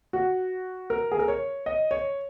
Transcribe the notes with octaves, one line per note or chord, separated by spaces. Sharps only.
F#4
A#4
G#4
A#4
C#5
D#5
C#5